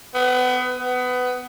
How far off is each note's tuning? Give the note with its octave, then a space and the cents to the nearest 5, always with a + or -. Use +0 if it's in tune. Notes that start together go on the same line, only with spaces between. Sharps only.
B3 +25
B3 +20